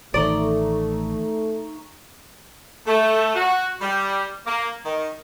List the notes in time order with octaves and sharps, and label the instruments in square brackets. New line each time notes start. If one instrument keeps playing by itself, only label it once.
[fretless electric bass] A1 D#3 [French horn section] A3 [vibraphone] D#4 A#5 C#6 [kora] D5
[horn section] A3
F#4
G3
A#3
D#3